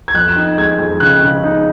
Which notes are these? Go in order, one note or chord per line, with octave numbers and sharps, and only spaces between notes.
G#6
F2 F#6
D#4
G#3 G#6
F2
C#3 F#6
C#3
D#4